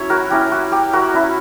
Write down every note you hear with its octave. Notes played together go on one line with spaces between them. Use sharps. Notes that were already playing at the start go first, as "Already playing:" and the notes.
Already playing: F#3 C#4 E4 C#5
F#4 A#4
F#3 C#4 E4 G4
F#4
G4
F#4 A#4
F#3 C#4 E4